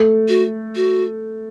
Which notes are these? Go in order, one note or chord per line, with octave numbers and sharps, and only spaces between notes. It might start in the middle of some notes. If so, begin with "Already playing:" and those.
Already playing: A3
F#4
F#4